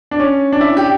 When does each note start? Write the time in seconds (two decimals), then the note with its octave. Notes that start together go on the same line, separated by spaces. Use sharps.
0.11 D4
0.20 C#4
0.53 D4
0.61 E4
0.77 G4